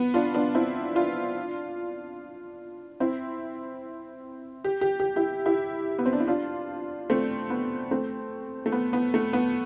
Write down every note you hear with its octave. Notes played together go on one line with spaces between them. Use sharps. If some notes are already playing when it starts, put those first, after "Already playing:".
Already playing: B3
D4 F4
B3 D4
C4 E4
D4 F4
C4 E4
G4
G4
G4
E4 G4
E4 G4
B3
C4
D4
E4
D4 F4
A3 C4
B3
A3 C4
A3
B3
B3
A3
B3